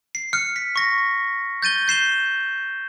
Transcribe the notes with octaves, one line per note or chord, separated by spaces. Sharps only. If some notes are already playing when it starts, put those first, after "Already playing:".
C7
F6 F#6 C#7
B6
C#6 A#6
G6 A6 D#7 G7
G6 C7 E7 G7